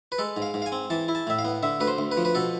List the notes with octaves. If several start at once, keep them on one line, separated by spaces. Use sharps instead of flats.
B4
G#3 A4
G#2
F5
G#2
F5
G#5
C4
E3 A5
E4
A5
A2 E5
F5
B3
D3 E5
D2 B4
C5
D2
B4
F3
B4
B2 A4